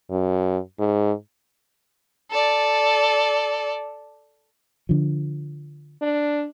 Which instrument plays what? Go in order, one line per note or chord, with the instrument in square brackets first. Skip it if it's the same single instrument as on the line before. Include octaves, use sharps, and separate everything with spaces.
[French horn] F#2
G#2
[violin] A4 D5
[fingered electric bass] D3 F3
[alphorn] D4